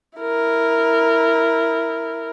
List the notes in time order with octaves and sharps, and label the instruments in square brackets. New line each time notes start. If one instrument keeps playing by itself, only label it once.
[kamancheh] E4 A#4